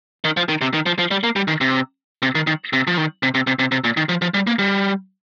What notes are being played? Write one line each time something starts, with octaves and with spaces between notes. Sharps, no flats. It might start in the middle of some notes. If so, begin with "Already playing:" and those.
D#3
F3
D#3
C3
D#3
F3
F3
G3
A#3
G3
D#3
C3
C3
D#3
D#3
C3
F3
D#3
C3
C3
C3
C3
C3
A#2
D#3
F3
F3
G3
A#3
G3